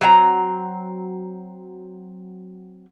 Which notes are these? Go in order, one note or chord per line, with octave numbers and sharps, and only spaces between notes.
F#3 C4 F5 A#5